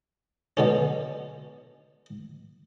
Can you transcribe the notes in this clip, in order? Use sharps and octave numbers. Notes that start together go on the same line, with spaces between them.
B2 D3 C#4